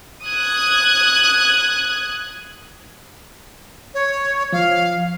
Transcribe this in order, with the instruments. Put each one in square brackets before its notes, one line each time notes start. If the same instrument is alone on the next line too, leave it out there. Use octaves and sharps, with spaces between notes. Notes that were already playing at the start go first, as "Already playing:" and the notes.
[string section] D#6 F#6 G#6
[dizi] C#5
[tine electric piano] F3 [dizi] F5